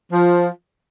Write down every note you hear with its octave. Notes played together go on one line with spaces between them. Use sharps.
F3